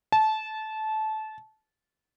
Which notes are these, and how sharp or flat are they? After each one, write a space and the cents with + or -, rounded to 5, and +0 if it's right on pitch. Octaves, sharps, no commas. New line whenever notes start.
A5 -20